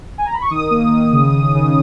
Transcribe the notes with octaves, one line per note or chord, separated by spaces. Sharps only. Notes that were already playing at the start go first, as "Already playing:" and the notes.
G#5
A#5
B5
C#6
D#3 D#6
A#3
D#3
C#3
C#3
C#3